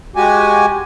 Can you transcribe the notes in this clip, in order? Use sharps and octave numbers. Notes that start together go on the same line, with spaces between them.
G#3 F#4 G4 G#5